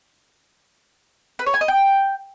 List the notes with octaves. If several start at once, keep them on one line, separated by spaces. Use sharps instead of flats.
B4
C#5
G#5
D#5
G5